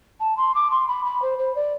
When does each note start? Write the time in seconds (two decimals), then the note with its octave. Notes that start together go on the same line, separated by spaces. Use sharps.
0.20 A5
0.37 C6
0.55 D6
0.71 C6
0.88 B5
1.05 B5
1.22 C5
1.39 C5
1.55 D5